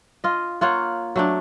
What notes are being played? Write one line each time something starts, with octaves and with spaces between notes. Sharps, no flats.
F4 D#5
A#3 F4 C#5 F#5
F#3 A3 D4